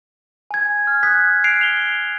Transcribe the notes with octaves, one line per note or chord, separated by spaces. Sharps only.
G#5 G#6
F6
D#6 F#6 G#6 B6
F#6 G#6 C7 D7 F7
F7 G7